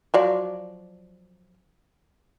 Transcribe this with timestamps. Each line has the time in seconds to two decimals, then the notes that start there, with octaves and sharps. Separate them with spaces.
0.14 F3 F#3 D5